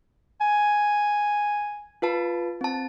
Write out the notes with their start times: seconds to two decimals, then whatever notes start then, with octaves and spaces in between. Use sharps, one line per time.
0.41 G#5
2.02 F4 B4 A5
2.61 C4 A5